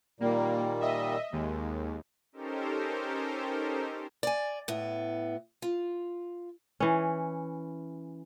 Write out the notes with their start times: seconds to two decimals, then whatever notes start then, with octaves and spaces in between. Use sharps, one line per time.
0.20 A#2 D#3 G3 A#3
0.81 D#5 E5
1.33 D#2 G#3
2.32 C#4 D#4 G4 A4 A#4 C5
4.23 D5 G#5
4.68 A2 B3
5.62 F4
6.80 E3 C#4